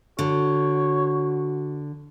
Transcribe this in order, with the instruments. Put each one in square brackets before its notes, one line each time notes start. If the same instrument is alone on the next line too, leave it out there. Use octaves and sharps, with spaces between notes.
[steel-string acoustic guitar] D3 [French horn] F#4 [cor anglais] C#5